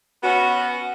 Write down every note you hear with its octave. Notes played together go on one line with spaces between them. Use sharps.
B3 C#4 F#4